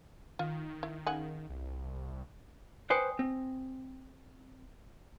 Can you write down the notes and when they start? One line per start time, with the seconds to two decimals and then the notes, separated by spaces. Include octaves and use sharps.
0.39 D#3 F4
0.83 E4
1.06 C#3 F#5 G#5
1.49 C2
2.90 B4 C5 D5 G5 G#5 D#6
3.19 C4